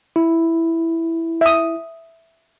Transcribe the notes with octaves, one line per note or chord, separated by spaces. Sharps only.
E4
E5 D#6